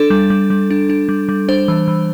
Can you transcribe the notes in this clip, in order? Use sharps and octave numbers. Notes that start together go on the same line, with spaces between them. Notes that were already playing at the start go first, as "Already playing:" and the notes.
Already playing: D4 A4
G3
G3
G3
D4
D4
G3
G3
D4 C5
E3
E3